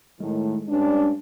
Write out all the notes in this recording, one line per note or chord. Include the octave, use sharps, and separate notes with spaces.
A2 D#3 G#3
G2 C#4 D4